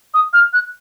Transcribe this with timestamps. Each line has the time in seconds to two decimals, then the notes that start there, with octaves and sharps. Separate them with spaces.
0.14 D#6
0.33 F6
0.53 F#6